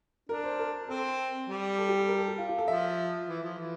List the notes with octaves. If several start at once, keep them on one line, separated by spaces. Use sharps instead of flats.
D4 A#4
C5
A#4
C4 A4
G3
A4
G4
A4
A#4
A4
G4
F4
F4
A4
F3 E5
E3
F3
E3